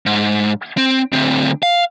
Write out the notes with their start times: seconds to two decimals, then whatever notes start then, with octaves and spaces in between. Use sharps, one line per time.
0.06 G#2
0.77 C4
1.13 D2 C4
1.63 F5